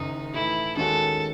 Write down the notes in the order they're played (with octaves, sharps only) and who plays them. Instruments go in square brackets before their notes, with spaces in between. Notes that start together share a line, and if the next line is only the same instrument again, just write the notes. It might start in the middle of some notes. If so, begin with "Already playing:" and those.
Already playing: [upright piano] F#1 F#2 D#3 [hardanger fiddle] D#4
[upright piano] A2 E3 A3 [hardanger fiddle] E4
[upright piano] D#2 D#3 G#3 C#4 F#4 [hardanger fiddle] A4